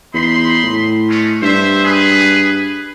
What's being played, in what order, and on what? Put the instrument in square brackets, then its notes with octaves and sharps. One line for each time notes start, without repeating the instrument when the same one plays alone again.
[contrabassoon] E2 [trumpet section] D#4 B5 C6
[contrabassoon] A2
[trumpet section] G#3 A3 C#4
[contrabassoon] G2 [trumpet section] C5 E5
[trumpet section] G#4 B4